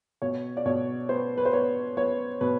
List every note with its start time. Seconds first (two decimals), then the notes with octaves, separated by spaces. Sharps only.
0.22 B2 C#5
0.57 D5
0.66 B2 C#5
1.09 B3 C5
1.38 B4
1.45 C5
1.53 B3 C#5
1.97 B3 C#5
2.41 B2 B4